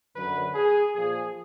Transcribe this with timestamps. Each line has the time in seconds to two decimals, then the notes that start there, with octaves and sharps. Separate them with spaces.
0.16 F#2 D3 F#3 B4
0.54 G#4
0.93 A#2 F3 G#4